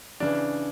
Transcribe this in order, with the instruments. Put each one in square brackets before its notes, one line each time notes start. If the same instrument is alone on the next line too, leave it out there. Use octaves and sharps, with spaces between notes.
[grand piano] C#3 E3 D4